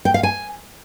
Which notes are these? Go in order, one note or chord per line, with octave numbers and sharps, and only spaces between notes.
G5
F5
G#5